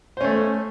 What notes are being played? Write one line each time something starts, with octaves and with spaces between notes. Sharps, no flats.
A3 C#4 C5